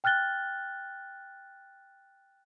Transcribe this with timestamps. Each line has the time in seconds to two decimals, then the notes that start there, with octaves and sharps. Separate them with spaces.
0.04 G5 F6 F#6 A6 G7